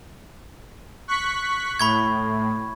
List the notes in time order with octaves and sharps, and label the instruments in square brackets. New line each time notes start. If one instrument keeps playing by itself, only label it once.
[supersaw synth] C#6 F#6 B6
[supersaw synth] A2 [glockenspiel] B5 C#6 G#6